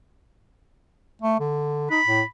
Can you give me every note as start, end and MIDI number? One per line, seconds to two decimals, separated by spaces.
1.22 1.37 57
1.40 1.88 50
1.91 2.00 63
1.91 2.24 83
2.07 2.22 45